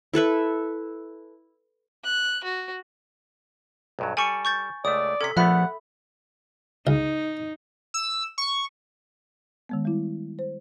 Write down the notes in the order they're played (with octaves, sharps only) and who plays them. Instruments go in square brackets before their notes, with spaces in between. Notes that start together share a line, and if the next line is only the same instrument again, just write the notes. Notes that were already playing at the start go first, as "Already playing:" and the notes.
[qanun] E4 A4 B4 E5
[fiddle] F#6
F#4
[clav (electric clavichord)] B1 G2 F#3
[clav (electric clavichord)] G3 A4 D5 [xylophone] G#5 C#6 C#7
[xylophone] C#6 G6 A6
[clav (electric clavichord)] C#2 A3 [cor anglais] D5 [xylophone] D#6
[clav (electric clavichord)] C3 C#4 [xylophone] A4 B6
[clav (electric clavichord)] A#1 A3 B3 [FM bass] F3 [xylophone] E5 B5 [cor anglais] F#5
[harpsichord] C#2 [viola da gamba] D#4
[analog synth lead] E6
C#6
[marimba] D#3 G#3 B3
G3 E4
C5